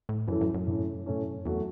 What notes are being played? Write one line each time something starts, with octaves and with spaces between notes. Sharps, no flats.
A2
F#2 E3 C#4 E4 A4
F#2
F#2
A2 A3 C#4
A2 A3 C#4
E2 F#3 A3 F#4